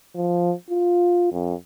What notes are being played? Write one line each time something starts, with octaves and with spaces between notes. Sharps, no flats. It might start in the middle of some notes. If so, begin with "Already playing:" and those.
F3
F4
F2